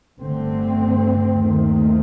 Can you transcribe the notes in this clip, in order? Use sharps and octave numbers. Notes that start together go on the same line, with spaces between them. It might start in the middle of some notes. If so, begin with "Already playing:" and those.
G1 G2 D3 A3 C4
D#2 D#3 A3 C4